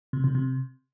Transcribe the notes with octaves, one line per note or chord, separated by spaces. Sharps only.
C3
C3
C3